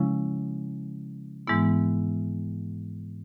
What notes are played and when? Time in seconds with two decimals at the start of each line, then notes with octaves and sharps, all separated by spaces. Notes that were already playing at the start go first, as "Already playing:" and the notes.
Already playing: C#3 F3 G#3 C#4 E4
1.47 G#2 E3 G#3 B3 E4